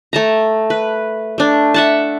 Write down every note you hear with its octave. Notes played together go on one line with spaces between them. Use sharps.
A3 A5 A#5
B4
A3 D4
E5 F#5 A5